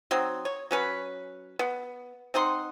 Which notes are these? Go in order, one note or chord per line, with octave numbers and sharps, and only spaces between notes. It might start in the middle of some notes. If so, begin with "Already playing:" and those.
F#3 C4 D#4
C#5
F#3 C#4 B4
B3
C4 D#4 F#5 C6